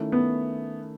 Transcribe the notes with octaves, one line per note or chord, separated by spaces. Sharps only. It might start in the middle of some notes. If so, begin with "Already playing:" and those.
Already playing: D#3 A3 C#4 E4
B3